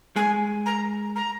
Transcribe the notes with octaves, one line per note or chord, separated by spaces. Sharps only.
G#3 G#5
A#5
A#5